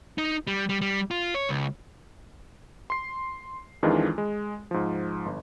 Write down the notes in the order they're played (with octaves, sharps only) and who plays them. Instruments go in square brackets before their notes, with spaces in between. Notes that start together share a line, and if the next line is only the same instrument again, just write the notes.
[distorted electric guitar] D#4
G3
G3
G3
F4
C#5
C#2
[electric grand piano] C6 C7
F2 D#3 E3 G#3 D4 F4
G#3
G#2 F3
G1